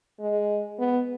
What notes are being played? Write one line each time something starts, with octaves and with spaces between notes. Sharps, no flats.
G#3
B3